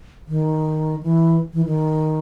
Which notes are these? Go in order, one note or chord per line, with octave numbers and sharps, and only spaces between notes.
D#3
E3
E3
D#3